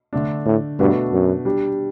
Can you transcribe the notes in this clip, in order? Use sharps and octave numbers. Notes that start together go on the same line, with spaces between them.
D3 A3 D4
A2
G2 B2 A3 D4 F#4 B4
F#2
G3 D4 G4